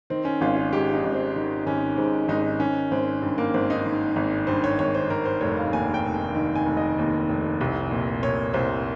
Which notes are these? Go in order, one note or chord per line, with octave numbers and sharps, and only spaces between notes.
D#3 C4
C#4
G#1 F4
F4
G#2 G4
D#4
G#1
C4
D#3
G#1 C#4
G#2 C4
G#1 D#4
D#3 C#4
G#1 C4
G2
A#3
G#1 C4
D#4
D#3
G#1
G2 C5
C#5
G#1 C#5
C5
D#3 A#4
C5
F1 C#5
F5
D#2 G#5
G5
F1
G#5
D#3
G#5
F1
D#5
D#2
F1
C2
A#2
A#2 C#5
C2 C5